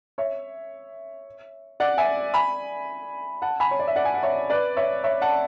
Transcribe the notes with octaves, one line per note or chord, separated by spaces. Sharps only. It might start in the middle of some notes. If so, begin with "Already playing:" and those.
C#5 E5
D5 F#5
E5 G#5
G#5 B5
F#5 A5
G#5 B5
C#5
D5
E5
D5 F#5
G#5
F#5
C#5 E5
B4 D5
C#5 E5
C#5 E5
F#5 A5